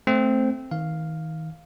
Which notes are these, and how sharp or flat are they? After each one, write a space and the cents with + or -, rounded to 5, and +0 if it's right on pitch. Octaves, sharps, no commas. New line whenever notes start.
A3 +0 C4 +0
D#3 +35 F5 +0